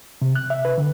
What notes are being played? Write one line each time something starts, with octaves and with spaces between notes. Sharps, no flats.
C3
F#6
E5
B4
D3